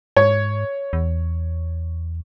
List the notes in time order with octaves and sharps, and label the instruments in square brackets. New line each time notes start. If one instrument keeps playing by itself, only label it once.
[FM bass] G#2 [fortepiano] C#5
[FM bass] E2